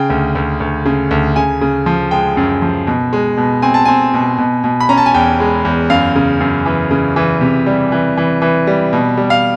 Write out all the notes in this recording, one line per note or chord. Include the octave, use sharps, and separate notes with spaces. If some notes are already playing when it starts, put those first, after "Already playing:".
Already playing: C#3 G5
D2
D2
D2
C#3
D2
C#3 G#5
C#3
F3
G#3 G5
F#2
F3
B2
G#3
B2
C4 G#5
A5
C4 G#5
B2
B2
B2
B5
C#4 A#5
A5
G#5
E2 G5
G#3
E2
F#2 F5
C#3
F#2
E3
C#3
E3
C3
G3
E3
E3
E3
G3
B2
G3
F5